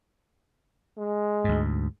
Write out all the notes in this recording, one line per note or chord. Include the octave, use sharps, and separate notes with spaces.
G#3
D2 G#2